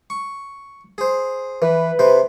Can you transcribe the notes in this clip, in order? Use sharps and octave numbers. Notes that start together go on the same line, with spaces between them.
C#6
G#4 C5
E3 B4
C3 C5